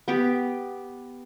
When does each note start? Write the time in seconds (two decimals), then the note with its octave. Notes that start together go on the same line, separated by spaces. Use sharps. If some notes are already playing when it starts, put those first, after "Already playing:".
0.08 B3 G4 G5